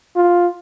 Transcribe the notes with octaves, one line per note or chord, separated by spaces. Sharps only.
F4